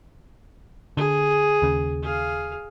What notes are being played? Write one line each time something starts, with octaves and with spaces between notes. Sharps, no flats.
D3 G#4
D#2 C#3
G#4 F5